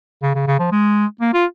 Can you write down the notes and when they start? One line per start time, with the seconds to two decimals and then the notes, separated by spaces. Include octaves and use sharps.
0.23 C#3
0.35 C#3
0.47 C#3
0.59 F3
0.72 G#3
1.21 A#3
1.34 F4